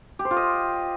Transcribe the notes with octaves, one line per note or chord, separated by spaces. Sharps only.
G4
C5
F4
D#5